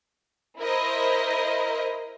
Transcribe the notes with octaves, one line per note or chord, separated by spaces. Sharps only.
E4 A#4 C5 D#5